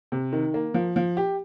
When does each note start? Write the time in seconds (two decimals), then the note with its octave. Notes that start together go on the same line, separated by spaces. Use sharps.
0.12 C3
0.33 D#3
0.54 A#3
0.74 F3
0.96 F3
1.17 G4